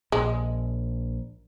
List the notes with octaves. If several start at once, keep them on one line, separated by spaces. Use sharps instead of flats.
A#1 G#3